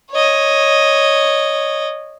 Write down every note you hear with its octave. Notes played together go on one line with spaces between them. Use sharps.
C#5 D#5